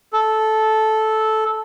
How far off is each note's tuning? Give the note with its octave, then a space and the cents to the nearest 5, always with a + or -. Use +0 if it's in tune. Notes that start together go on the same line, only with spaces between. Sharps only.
A4 -10